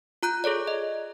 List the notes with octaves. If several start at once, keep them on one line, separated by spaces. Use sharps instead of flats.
F4 A#5 F#6 G6
G#4 A4 C#5 D5
D#5